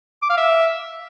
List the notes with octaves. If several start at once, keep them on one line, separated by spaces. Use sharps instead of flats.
D6
F5
E5